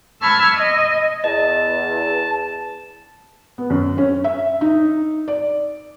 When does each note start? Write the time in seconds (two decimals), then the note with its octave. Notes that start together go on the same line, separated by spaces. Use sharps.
0.21 A5 B5 C#6 E6 F6 G#6
0.53 D#5
1.24 E2 D#5 A5
3.58 B3
3.70 F#2
3.98 C#4
4.24 E5
4.61 D#4
5.28 D5